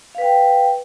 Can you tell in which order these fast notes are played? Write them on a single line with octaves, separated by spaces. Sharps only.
F5 B4 G5